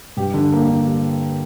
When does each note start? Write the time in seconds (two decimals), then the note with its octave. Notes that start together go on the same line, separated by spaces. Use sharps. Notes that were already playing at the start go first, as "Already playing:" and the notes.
0.17 G2 G4
0.34 D3
0.52 A#3
0.69 D3
0.85 G3